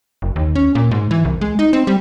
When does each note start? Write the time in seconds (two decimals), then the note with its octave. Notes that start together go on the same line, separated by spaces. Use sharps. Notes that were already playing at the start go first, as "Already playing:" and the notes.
0.22 F#1
0.36 D#2
0.55 C#4
0.75 A#2
0.91 G#2
1.11 E3
1.25 C2
1.41 G#3
1.59 D#4
1.73 C4
1.87 G3